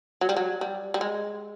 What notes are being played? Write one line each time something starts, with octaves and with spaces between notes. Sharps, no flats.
F#3
G3
F#3
G3
G3
G#3